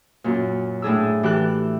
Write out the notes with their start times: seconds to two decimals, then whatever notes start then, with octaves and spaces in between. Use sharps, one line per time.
0.24 F#2 A#2
0.82 A2 D4 G#4 E6
1.23 E3 G4 A4 F#6